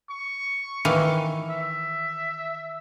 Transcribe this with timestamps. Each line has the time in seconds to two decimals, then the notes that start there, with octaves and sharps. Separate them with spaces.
0.11 C#6
0.85 D#3 E3 F5
1.51 E5